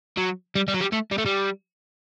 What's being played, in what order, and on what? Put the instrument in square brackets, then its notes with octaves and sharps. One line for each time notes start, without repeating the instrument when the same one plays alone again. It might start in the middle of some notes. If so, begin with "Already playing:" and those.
[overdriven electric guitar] F#3
G3
G3
F#3
G3
A3
G3
A3
G3